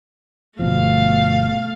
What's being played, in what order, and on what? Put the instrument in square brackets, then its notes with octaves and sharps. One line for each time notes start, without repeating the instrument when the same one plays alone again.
[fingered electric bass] G1 B2 F3 [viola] A3 F5